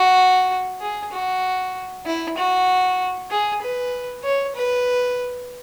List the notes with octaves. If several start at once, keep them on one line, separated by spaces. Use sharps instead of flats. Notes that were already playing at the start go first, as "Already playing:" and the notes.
Already playing: F#4
G#4
F#4
E4
F#4
G#4
B4
C#5
B4